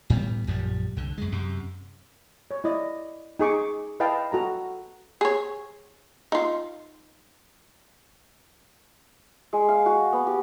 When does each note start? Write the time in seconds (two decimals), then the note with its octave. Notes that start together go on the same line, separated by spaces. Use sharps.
0.10 A2 G3 B3
0.47 A#1 F#2 F3 G3
0.97 C2 D3
1.18 F#2 G#3
1.32 F#2 C3
2.51 C#5
2.64 E4 D5 D#5
3.39 D#4 G#4 C#6 D6
4.00 E4 B4 D#5 F5 G5 A5
4.32 F#4 A4 A#5
5.21 G#4 C#5
6.32 D#4 F4
9.53 G#3
9.69 F5
9.86 F#4
10.13 B3
10.27 G4